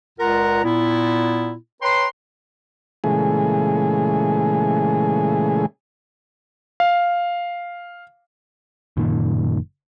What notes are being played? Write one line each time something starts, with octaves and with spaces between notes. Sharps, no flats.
C#2 A#2 F4 A#4 F#5 A#5
A#2 B3 E4
B4 C#5 G5 A#5 C6
A#2 C#3 E3 G#3 A3 G#4
F5
F#1 A#2 D#3